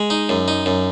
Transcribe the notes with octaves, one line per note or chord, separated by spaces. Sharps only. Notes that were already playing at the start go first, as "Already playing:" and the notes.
Already playing: G#3
D#4
F#2
D#4
F#2